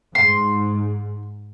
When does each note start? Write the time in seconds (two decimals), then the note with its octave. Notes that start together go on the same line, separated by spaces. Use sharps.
0.15 G#2 C6